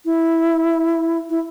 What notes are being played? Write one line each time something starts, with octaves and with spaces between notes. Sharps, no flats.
E4
E4